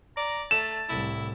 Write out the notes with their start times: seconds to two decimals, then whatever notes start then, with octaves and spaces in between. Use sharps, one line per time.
0.17 D5 A#5
0.51 A3 A5 E7
0.89 C2 A2 E4